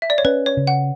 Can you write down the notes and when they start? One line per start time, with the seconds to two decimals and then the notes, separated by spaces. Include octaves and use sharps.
0.02 E5
0.10 D5
0.18 C#5
0.25 C#4 B4
0.46 C#5
0.57 C#3
0.67 F#5